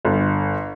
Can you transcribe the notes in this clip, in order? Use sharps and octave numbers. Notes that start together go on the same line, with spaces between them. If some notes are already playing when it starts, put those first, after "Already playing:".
G1